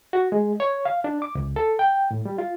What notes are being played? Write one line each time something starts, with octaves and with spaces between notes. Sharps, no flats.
F#4
G#3
C#5
F5
D4
D6
C#2
A4
G5
A2
G3
F4